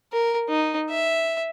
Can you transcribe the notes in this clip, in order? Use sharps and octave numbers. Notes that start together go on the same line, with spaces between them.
A#4
D#4
E5